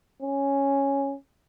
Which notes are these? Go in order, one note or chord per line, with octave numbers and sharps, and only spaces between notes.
C#4